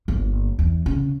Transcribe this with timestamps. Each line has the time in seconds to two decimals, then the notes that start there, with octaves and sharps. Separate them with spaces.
0.08 G1 A#3
0.59 E2
0.86 C#3